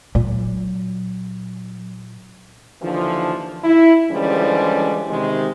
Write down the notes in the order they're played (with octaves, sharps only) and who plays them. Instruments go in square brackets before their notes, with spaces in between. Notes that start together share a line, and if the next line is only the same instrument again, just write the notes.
[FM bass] A#2 [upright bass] F#3
[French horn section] D#2 D3 E3 F3
E4
D3 E3 F3 G3 G#3 C#4
C3 D#3 G#3